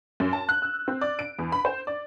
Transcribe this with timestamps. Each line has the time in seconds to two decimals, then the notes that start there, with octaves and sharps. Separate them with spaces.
0.20 F#2
0.33 A5
0.49 F#6
0.62 E6
0.88 C4
1.01 D5
1.19 D7
1.39 E2
1.52 B5
1.65 C5
1.87 D5